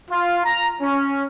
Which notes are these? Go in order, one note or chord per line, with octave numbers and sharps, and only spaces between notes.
F4
A#5
C#4